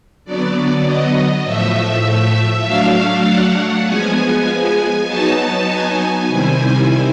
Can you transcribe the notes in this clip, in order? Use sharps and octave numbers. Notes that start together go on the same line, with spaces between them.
D3 F#3 B3 D5
D#5
A2 F3 A3 E5
F#3 A3 D4 F5
F#5
F3 G#3 B3 G#5
F#3 B3 D#4 A5
G#5
C3 D#3 G3 C4 E4